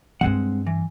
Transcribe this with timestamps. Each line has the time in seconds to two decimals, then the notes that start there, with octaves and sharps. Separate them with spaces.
0.21 G2 G#3 C4 D4 F#5
0.67 E3